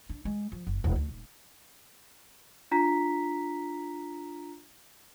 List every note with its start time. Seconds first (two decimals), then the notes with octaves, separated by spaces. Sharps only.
0.09 D4
0.25 G#3
0.52 F3
0.67 F#1
0.84 D#1
0.96 D2
1.08 D#1
2.71 D4 F4 A#5 B6